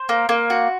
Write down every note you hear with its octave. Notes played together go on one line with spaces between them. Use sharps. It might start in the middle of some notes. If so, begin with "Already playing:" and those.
Already playing: C5
A#3
A#3
F#4